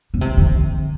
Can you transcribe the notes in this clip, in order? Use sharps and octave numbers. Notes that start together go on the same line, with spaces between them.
C#3
C3
D3